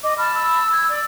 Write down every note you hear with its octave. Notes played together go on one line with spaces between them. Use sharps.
D#5 D6
A5 B5 F6
E6
G#6
D5